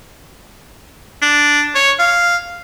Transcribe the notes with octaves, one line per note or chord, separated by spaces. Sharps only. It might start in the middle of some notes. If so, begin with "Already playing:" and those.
D4
C#5
F5